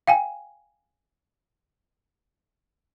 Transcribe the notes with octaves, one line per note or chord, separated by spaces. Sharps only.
F5 G5 G#5